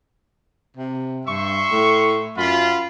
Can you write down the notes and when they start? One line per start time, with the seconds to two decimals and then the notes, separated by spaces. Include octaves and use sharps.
0.77 C3
1.27 G2 E5 C6 C#6
1.71 A2
2.37 F#2 F4 B5